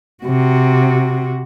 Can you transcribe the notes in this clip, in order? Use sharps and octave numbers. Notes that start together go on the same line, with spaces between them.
C3 F#4